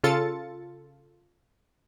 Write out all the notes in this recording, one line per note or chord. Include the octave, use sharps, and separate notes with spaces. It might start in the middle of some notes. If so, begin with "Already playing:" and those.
C#3 F4 A4 A6 C#7